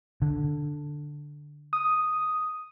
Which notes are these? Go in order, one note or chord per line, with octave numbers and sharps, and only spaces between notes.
D3
D#6